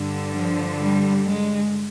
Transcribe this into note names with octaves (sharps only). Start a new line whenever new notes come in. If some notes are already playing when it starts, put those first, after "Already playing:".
Already playing: G2 D3
F3
G3
G#3